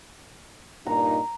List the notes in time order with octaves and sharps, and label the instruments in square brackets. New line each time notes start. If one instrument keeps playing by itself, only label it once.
[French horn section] G2 A#2 D#4 [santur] A#5